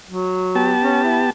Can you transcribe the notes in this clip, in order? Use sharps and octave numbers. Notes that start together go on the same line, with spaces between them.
F#3
B3 G4 A5
C#4
E4